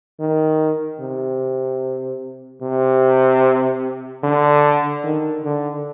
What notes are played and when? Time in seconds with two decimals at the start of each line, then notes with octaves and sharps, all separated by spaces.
0.20 D#3
1.01 C3
2.62 C3
4.23 D3
5.04 D#3
5.44 D3